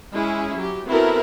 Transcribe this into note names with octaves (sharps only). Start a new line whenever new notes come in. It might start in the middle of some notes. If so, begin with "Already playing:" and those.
G#3 C#4 E4 G#4
F#3 G4
B3 C4 E4 F#4 A4 A#4